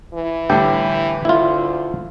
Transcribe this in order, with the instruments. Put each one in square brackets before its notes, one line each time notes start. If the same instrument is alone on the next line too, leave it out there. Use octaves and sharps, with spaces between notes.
[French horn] E3
[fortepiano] A2 D3 G3 [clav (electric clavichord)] G5
[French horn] D2 [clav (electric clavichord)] E4 F4